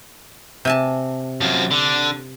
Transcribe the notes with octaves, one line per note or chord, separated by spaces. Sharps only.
C3 G#5 A5
F#2 F3
D3